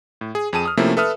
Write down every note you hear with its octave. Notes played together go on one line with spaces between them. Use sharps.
A2
G#4
F2 G#4 A5 D#7
D#6 F6
C3 F3 A3 A#3 C#4 E4
A4 B4 E5 D#6 F6